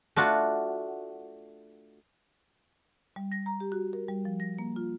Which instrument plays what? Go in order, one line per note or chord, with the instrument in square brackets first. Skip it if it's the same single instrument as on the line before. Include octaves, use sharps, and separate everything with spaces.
[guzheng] A3 D4 F4 F#4
[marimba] G3
A#6
A#5
G4
F#4
A#4
G3
F3
A#6
A#3
F4